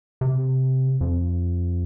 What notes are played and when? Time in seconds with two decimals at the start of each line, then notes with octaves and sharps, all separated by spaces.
0.21 C3
1.01 F2